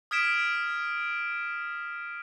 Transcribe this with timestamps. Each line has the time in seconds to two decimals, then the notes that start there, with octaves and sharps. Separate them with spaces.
0.11 D#6 F6 G#6 B6 D7 E7